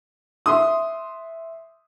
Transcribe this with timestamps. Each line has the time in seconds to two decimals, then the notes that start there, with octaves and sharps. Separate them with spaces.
0.46 E5 C6 D#6